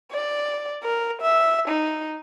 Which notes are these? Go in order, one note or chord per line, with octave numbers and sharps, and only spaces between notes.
D5
A#4
E5
D#4